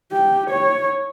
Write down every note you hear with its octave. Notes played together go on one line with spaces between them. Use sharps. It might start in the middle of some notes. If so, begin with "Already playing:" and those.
G4
C#5